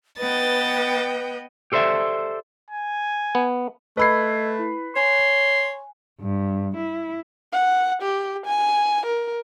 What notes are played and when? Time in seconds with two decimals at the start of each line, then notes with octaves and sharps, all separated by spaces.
0.18 B3 B4 D#5 G5 A6
1.72 G4 A4 C5 D5 E5
2.70 G#5
3.35 B3
3.97 A3 B4 D#5 B5 E6 G#6 C7
4.59 E4
4.96 C#5 G#5 C6
6.21 G2
6.76 E4
7.52 F#5
8.02 G4
8.46 G#5
9.06 A#4